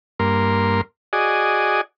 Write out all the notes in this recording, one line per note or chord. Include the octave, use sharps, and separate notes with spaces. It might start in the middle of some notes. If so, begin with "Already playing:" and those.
G2 A#3 A#4 C6
F#4 G#4 D5 D#5 G#5